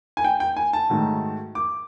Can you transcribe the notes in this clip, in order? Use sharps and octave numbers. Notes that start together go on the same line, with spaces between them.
G#5
G5
G5
G#5
A5
G#2 D#3 F#3 A3
D6